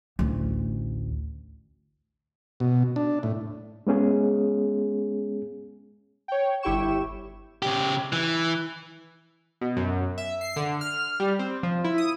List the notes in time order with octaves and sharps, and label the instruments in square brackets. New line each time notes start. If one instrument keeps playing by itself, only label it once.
[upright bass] A1 D2
[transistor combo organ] B2
D4
A2
[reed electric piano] G#3 B3 C#4 G#4
[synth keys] C#5 G5
G1 E4 G4 G5 C#6 E7
[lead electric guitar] C#3 G4
E3
[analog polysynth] B2
F#2
E5
C7
D3
F6
G3
C4
F3
E4
D#6